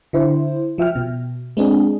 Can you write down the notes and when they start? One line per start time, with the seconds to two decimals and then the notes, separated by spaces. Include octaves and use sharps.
0.13 D3 E4 C5
0.78 F3 E5 G5 F6
0.95 B2
1.57 G#3 C4 D4 G#4